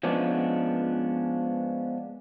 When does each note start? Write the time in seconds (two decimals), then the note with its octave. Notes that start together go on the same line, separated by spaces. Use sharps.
0.03 F3 G#3 B3 C#4 D4